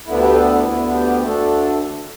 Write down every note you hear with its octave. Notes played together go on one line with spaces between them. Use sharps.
D2 D3 B3 D4 E4
G4
A4
E4
D2 D3 B3 D4 E4
G4
D2 D3 A3 D4 A4